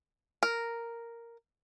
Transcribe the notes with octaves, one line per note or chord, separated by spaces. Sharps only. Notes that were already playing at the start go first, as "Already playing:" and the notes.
A#4